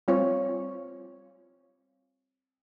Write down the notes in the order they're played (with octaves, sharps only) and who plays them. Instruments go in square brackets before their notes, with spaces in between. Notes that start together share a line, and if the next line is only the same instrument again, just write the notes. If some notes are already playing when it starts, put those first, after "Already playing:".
[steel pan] G3 C4 F4 C#5